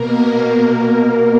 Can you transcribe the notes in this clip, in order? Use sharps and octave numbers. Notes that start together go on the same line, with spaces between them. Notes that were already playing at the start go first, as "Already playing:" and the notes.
Already playing: B2 A#3 A#4